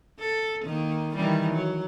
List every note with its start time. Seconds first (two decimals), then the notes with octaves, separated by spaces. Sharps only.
0.20 A4
0.65 D#3 A#3
1.15 D#3 E3 G3
1.53 F#3